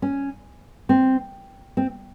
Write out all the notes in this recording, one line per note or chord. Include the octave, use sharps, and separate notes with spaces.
C#4
C4
C4